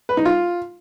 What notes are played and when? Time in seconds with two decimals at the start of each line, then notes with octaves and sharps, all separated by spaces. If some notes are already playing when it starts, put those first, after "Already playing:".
0.09 B4
0.17 D#4
0.25 F4